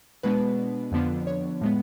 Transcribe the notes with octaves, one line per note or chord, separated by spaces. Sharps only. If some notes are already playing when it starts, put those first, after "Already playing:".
B2 G#3 B3 D4 B4
F2 D3 F3 B3 D4
C#5
A2 G#3 B3